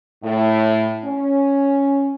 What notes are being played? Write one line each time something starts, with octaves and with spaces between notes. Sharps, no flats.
A2
C#4